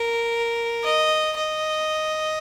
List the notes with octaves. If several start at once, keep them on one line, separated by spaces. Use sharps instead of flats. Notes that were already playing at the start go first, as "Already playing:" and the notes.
Already playing: A#4
D#5
D#5